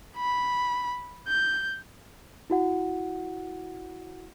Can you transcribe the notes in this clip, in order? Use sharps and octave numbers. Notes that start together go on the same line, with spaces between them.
B5
G6
E4 F#4 F#5